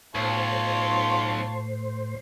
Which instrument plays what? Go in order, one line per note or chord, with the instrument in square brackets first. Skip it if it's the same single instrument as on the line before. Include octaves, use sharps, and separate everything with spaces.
[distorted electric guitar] B1 [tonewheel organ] A2 C5 [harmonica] F4 C#5 A5